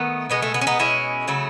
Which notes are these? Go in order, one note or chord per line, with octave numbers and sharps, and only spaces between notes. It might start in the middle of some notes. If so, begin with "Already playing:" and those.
Already playing: D#3 A3 B3
B2 G#3 B3
A3
B3
C#4
B3 D#4
B2 G#3 C#4 E4
C#3 F#3 A3